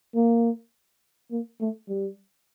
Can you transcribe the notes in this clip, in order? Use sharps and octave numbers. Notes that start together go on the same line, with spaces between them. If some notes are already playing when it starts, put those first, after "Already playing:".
A#3
A#3
A3
G3